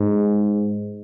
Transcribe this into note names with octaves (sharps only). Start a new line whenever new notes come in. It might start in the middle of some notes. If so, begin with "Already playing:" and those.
Already playing: G#2